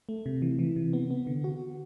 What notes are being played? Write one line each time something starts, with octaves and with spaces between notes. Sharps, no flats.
A3
C3
E3
E3
C3
B3
B3
D3
F#4